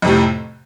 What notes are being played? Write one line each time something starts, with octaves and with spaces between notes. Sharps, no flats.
F2 A2 C3